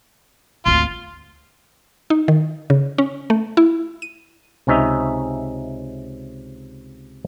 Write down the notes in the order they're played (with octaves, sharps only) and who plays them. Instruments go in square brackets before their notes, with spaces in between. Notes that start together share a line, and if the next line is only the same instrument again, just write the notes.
[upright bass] G#1 D2 [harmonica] F4
[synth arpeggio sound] D#4
D#3
C#3
C#4
A3
E4
D#7
[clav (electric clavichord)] C#2 C3 C#4 D#4 E5